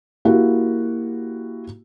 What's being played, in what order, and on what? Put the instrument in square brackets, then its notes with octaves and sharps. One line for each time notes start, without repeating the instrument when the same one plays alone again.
[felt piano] A#3 E4 F#4 G4